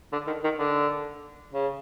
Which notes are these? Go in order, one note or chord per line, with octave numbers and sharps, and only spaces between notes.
D3
D#3
D#3
D3
C#3